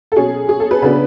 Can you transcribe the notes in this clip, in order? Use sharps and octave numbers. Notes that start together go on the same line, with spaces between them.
A4
B2 F#3 C#4 G#4
G#4
A4
B4
C#3 F#3 B3 D4 B4